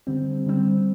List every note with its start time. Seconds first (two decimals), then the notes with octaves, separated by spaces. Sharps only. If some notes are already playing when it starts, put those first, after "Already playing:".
0.07 D3 G3 C4
0.46 D3 G3 C4